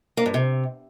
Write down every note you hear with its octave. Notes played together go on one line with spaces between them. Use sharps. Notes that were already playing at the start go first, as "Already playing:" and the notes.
A#3
G2
C3